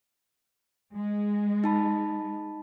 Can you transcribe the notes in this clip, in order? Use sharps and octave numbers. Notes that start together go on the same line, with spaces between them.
G#3
D#4 A5 B5